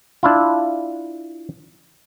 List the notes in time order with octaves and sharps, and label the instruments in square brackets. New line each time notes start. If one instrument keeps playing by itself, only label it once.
[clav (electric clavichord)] D4 E4 F4